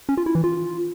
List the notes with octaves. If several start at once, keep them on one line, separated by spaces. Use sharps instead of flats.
C#4
F4
E4
E3
F4